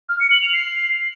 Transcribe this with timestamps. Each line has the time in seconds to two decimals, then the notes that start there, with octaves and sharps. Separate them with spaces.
0.09 F6
0.20 C#7
0.31 F#7
0.42 F7
0.53 C7